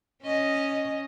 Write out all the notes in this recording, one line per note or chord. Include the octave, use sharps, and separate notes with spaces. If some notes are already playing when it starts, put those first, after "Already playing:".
C#4 D#5